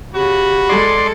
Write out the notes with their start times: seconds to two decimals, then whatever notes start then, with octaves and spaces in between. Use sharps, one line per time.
0.14 C#3 F#4 G4 B5
0.69 G#3 A4 D5 C6